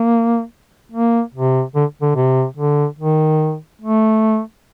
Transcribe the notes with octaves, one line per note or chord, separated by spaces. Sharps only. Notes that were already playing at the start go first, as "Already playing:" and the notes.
Already playing: A#3
A#3
C3
D3
D3
C3
D3
D#3
A3